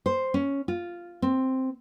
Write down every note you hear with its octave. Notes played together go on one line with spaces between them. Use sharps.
C5
C#4
F4
C4